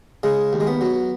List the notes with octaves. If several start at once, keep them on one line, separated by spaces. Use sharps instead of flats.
C#3 G#3
D#2
G#3
B3
F#3